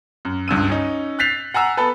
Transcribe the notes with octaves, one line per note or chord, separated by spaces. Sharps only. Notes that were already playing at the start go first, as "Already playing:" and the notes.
F#2
C#2 G2 E6 D#7
C#4 D#4
F#6 G6 A6 B6 C7 F7
F#5 G#5 A#5 E6
B3 A4 B4